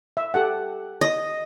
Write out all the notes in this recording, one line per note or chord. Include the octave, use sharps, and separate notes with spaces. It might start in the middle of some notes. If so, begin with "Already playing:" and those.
E5
G4 A4 F#5
D#5